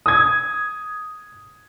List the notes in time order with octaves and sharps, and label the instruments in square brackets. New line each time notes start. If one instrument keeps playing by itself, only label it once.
[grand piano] D#6 G#6